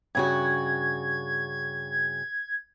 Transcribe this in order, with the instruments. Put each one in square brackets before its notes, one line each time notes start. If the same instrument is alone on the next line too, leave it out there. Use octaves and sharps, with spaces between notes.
[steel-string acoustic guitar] G2 C#3 F#4 [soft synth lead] G#6